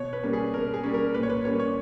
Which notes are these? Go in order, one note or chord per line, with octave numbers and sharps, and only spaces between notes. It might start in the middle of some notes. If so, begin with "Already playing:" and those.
Already playing: B2 C#5
B4
G3 A#3 C#4
G#4
B2 A#4
G#4
G3 A#3 C#4
A#4
A#2 B4
C#5
B4
G3 A#3 C#4 C#5
C#5